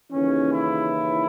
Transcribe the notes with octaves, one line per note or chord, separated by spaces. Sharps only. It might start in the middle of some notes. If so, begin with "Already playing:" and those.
D#2 C#3 E3 C#4
E4